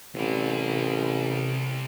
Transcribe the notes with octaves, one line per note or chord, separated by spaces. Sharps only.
A1 C3 D5